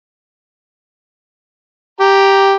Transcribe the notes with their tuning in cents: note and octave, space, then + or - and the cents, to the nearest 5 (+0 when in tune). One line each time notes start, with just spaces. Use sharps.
G4 +0 A#5 +0